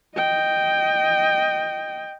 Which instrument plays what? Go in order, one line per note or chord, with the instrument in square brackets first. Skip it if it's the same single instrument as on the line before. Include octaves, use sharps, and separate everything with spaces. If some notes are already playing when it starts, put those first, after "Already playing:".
[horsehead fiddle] D#5 G5